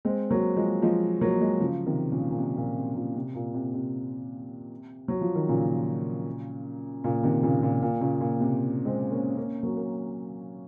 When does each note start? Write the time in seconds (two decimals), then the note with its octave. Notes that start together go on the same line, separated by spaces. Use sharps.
0.05 G#3 C4
0.30 F#3 A#3
0.56 F3 G#3
0.82 F3 G#3
1.21 F#3 A#3
1.41 F3 G#3
1.60 C#3 F3
1.86 C3 D#3
2.12 A#2 C#3
2.30 A#2
2.38 C3
2.57 A#2
2.77 C3
2.96 A#2
3.16 C3
3.35 A#2
3.54 C3
3.74 C3
5.08 F#3
5.21 F3
5.35 D#3
5.49 A#2 C#3
7.04 A#2 C#3
7.24 C3 D#3
7.43 A#2 C#3
7.63 A#2
7.82 A#2
8.01 A#2 C#3
8.21 A#2
8.40 C3
8.85 G#3 C4
9.11 A#3 C#4
9.37 A#3 C#4
9.63 F#3 A#3
9.77 A#3